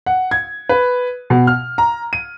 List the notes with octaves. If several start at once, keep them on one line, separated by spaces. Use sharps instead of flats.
F#5
G#6
B4
B2
F6
A#5
D#7